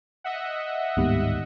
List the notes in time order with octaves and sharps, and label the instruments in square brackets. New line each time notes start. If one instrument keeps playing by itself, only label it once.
[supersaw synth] D#5 E5 F#5
[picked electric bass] D1 A#3 B3 [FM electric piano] G#2 D#3 G3